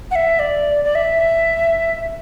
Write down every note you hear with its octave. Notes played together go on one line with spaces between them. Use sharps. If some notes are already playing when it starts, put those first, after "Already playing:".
F#5
E5
D5
D5
E5